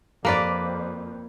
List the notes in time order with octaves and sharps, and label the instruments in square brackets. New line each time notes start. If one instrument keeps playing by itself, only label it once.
[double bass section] F2 [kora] A#3 B4 D5